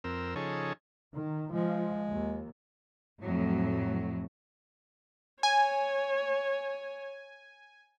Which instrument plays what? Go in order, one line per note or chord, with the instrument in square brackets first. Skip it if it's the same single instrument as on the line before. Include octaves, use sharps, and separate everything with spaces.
[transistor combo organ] F2 C4 A#4 E6
C#3 F3 D#4 G#4 A4 C#5
[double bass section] D#3
[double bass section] F3 [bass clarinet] G#3
[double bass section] D#2
[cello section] F2 A2 F#3
[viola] C#5 [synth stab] G#5